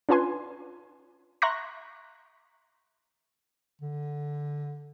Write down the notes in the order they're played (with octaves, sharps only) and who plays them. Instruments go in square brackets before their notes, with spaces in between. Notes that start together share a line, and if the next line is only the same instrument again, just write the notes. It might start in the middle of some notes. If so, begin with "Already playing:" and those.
[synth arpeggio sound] C#4 D4 F4 B4 G#5 C6
E5 A#5 C6 C#6 F#6 A#6
[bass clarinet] D3